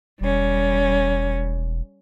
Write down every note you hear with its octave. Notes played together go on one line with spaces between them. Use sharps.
E1 G3 C#4